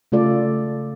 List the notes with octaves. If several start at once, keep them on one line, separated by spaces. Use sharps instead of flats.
C#3 A3 F4 A4 D5